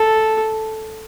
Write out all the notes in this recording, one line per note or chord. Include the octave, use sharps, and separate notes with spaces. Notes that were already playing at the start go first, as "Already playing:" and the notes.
Already playing: A4